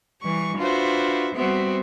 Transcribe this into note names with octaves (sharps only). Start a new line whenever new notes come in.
E3 G3 C#6
D4 F4 F#4 B4 C5 E5
G3 B3 C4 F#4 E5